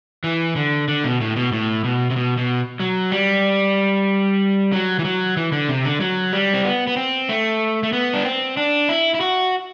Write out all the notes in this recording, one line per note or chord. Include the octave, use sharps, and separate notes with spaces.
E3
D3
D3
B2
A2
B2
A2
B2
C3
B2
B2
F#3
G3
F#3
E3
F#3
E3
D3
C3
D3
F#3
G3
C4
B3
B3
C4
A3
A3
B3
D4
C4
D4
E4
E4
F#4